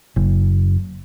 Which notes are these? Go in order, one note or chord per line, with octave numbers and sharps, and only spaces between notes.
F#1